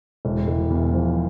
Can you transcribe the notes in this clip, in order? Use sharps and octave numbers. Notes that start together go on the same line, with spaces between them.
E1
E1
E2
F3